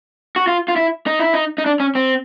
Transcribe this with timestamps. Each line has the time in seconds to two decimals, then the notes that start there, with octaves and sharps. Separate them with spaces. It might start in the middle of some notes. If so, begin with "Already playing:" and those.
0.36 F#4
0.47 F4
0.68 F4
0.76 E4
1.07 D#4
1.19 E4
1.34 D#4
1.58 D#4
1.66 D4
1.80 C#4
1.95 C4